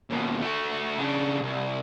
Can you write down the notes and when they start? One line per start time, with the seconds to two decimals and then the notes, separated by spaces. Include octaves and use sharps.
0.10 D#2 B2
0.41 A3 F#4
0.99 C#3 D4
1.41 C2